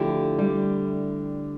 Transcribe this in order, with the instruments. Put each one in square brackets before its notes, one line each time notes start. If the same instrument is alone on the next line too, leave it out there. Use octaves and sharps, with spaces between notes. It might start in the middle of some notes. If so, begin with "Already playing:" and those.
Already playing: [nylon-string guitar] D3 A3 E4 G4 [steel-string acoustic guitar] F3
[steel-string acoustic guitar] G3